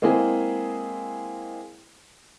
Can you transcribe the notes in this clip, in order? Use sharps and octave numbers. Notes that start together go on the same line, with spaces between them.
G#3 A#3 C4 E4 G#4